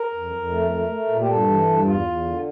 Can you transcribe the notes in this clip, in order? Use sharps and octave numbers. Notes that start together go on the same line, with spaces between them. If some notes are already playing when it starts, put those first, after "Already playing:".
Already playing: A#4
F2
F2
A3
A3
A3
A#2
G4
G2 A4
E3
G2
E2 F4
E2
D3